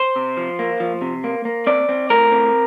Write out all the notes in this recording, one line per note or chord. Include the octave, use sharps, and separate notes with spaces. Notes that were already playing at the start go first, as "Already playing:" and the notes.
Already playing: C5
C3
F3
A#3
F3
C3
A#3
A#3
C4 D5
C4
A2 A#4
C4